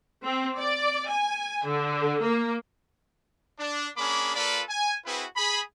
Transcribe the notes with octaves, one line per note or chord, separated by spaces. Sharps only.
C4
D5
G#5
D3
A#3
D4
A#3 C#4 D4 G#4 B5 D6
A#3 F4 A4 B4 D5 B5
G#5
C4 E4 F#4 G#4 B4
G#4 B5